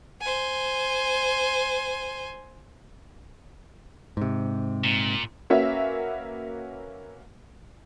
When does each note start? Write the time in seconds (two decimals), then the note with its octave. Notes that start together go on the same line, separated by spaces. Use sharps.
0.21 C5 G#5
4.17 G#2 C3
4.84 A#2
5.50 A#3 C#4 F#4 B4 E5